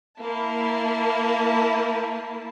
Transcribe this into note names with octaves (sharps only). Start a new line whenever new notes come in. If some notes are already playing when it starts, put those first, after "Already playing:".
A#3 E4 A5